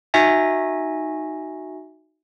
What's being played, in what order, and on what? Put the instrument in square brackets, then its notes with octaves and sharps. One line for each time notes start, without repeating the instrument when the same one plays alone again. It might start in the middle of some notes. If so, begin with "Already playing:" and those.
[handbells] D#4 F#4 E5 G#5 A#6